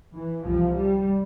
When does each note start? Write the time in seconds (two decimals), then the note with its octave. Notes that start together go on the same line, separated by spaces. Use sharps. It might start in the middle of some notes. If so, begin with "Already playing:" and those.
0.14 E3
0.45 C2 C3 F3
0.77 G3